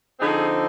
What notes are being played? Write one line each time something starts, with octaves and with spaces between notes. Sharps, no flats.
D3 F3 C4 D#4 G#4